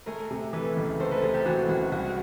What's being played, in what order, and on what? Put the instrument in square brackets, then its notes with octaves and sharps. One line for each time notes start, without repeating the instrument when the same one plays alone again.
[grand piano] A3 [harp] G#4 A#4
[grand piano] C3
[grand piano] E3 [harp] A4 B4
[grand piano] C#2
[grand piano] A3 [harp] A#4 C5
[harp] A4 B4
[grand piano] C3 [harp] G#4 A#4
[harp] G4 A4
[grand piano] E3 [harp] F#4 G#4
[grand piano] C#2 [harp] F#4
[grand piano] C2 [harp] F#4